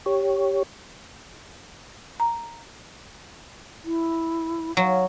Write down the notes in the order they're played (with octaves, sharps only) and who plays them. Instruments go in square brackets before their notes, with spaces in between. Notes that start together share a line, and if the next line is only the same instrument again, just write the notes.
[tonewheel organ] G4 C#5
[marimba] A#5
[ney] E4
[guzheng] F#3 [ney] F5